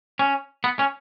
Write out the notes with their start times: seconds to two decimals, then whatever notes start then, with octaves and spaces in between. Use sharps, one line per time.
0.19 C#4
0.64 B3
0.79 C#4